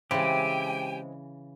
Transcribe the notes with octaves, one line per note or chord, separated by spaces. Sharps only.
C#3 E3 G#3 C4 G4 G5 G#5